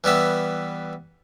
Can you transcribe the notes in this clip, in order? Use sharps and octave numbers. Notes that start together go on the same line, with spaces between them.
E3 G3 B3 E5